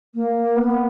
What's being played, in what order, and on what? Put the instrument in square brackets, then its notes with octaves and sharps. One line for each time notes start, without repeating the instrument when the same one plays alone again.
[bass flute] A#3
B3